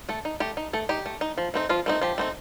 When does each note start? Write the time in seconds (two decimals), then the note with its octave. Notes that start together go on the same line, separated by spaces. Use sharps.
0.09 A3 A4
0.25 D#4
0.40 A3 G4
0.57 D#4
0.73 A3 A4
0.89 D#4 G4
1.06 A3
1.21 D#4
1.38 F3
1.54 A3 C4 D#4
1.69 F3 F4
1.86 A3 C4 D#4
2.01 F3 G4
2.18 A3 C4 D#4